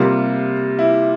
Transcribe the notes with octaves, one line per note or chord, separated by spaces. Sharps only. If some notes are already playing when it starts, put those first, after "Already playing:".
Already playing: C3 G3 A#3 F4
E4